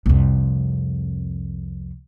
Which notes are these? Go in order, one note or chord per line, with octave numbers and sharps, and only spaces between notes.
C2 F2